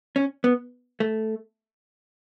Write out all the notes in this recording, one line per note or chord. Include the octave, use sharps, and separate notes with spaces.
C#4
B3
A3